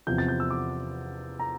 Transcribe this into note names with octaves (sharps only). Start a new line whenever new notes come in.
E2 C3 F3 G6
A6
G6
E6
D6
A#5